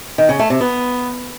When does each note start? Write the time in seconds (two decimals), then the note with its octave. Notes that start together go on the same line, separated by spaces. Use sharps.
0.18 D#3
0.29 C#3
0.39 A3
0.50 C3
0.61 B3